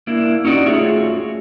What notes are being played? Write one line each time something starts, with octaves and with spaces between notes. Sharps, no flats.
A#3 D4 E4
C#4 D#4 F#4 D5
A3 F4 F#4 G#4 C#5 E5